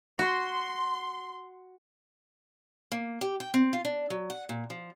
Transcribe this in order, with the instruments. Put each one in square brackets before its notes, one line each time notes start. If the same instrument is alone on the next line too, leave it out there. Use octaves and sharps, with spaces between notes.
[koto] F#4 [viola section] C6
[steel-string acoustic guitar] A#3
G4
G5
C4
F4
D4
F#3
F#5
A#2
F3